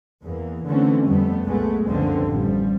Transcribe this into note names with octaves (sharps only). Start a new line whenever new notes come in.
E2 E3 A#3
D3 E3 A3 C4 C#4
F2 G3 A3 B3
B1 A#2 G#3 A3 B3
C#2 F#2 B2 D3 F3 C4
A1 F3 G3